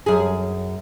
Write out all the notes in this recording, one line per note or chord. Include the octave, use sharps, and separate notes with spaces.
F#2 G#4